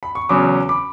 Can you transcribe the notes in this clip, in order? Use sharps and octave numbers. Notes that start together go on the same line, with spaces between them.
B5
C#6
E2 C#3 F#3 C#4 B5 D6
B5 D6